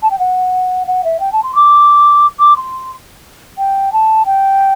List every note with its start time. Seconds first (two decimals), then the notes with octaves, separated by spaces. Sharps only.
0.02 A5
0.11 G5
0.19 F#5
0.87 F#5
1.04 E5
1.20 G5
1.32 A5
1.43 C6
1.55 D6
2.39 D6
2.56 C6
3.58 G5
3.92 A5
4.25 G5